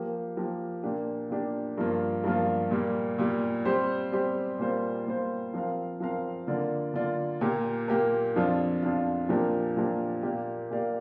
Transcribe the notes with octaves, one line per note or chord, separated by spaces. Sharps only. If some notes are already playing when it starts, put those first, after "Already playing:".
Already playing: F3 A#3 G4 A#4
F3 A#3 G4 A#4
A#2 A#3 D4 G4
A#2 A#3 D4 G4
G2 F3 A#3 F4
G2 F3 A#3 F4
A#2 G3 A#3
A#2 G3 A#3
G3 C4 G4 C5
G3 C4 G4 C5
A#2 G3 A#3 F4 C5
A#2 G3 A#3 F4 C5
F3 C4 A#4 F5
F3 C4 A#4 F5
D3 A#3 F4 D5
D3 A#3 F4 D5
A#2 A#3 G4 A#4
A#2 A#3 G4 A#4
F2 F3 D4 F4
F2 F3 D4 F4
A#2 F3 D4 G4 A#4
A#2 F3 D4 G4 A#4
A#2 A#3 G4 D5 F5
A#2 A#3 G4 D5 F5